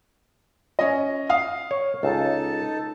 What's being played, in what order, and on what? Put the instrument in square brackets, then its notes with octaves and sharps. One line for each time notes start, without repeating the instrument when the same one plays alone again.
[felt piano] C#4 D#5
F5 D#6
[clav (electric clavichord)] C#5
[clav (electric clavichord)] C#2 [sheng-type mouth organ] D#4 A4 A5